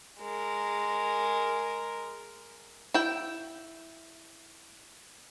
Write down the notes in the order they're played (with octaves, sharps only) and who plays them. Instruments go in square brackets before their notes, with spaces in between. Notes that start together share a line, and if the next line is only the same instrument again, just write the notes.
[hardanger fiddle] G#3 A#4
[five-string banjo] E4 G5